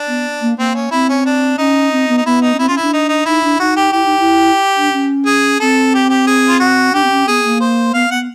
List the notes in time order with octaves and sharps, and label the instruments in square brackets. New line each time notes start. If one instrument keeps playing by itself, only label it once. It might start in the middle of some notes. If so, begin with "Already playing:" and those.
Already playing: [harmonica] D4
[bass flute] B3
A#3
[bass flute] A#3 [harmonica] C4
[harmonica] C#4
[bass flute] C4 [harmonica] E4
[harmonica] C#4
D4
[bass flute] C#4 [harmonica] D#4
[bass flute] C4
B3
[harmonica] D#4
[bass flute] B3 [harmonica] E4
[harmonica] D#4
[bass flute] C#4
[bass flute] C4 [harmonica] E4
[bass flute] C#4 [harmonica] F4
[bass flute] D4 [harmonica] E4
[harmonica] D#4
D#4
[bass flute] D#4 [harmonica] E4
[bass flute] D4
[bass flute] D#4 [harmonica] F#4
[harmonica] G4
[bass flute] E4 [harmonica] G4
[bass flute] D#4
E4
D4
C#4
[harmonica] G#4
[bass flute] C4 [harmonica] A4
[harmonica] G4
G4
G#4
F4
F#4
[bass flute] D4 [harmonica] G4
[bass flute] C4
C#4
[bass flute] B3 [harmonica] G#4
[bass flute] A#3
[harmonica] C5
[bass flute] B3 [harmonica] F5
[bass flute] B3 [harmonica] F#5